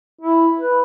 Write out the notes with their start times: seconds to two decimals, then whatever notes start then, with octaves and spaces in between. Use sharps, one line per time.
0.21 E4
0.59 B4